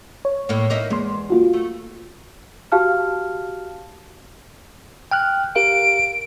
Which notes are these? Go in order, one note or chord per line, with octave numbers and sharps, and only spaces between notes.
C#5
A2 A#3
A#3 D#4 E4
E2 G#3 A#3 C6
A#3 F4 F#4
A3
F#4 G4 F5 A5 F6
G5 F6 F#6
G4 A#4 F5 D7